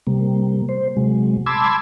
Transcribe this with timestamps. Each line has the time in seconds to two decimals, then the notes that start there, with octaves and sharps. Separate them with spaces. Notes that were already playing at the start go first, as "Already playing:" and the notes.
0.07 C3 G3 A#3
0.69 C5
0.97 C3 F#3 G#3
1.46 A5 B5 C6 D6 E6 G#6